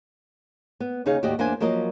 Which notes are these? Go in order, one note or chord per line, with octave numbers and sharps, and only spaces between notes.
B3
D#2 C#3 D#4 G#4 C#5 F5
D#2 A2 F#4 G4 D5 D#5
E2 A#3 D4 C5 E5 G#5
F3 F#3 A#3 A#4 D#5